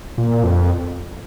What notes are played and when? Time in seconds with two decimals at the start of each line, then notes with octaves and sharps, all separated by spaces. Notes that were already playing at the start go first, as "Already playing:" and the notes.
0.18 A#2
0.44 F2